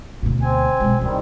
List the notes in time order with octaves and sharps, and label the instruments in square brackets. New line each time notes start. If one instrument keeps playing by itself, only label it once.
[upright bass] D2 B2
[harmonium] C4 G#5
[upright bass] B1 G#3
[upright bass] C2 E4 [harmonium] D#3 G3 C4